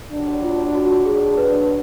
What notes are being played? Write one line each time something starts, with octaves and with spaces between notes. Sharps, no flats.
D#2 D3 F#3 D4
F4
F#4
G#4
B4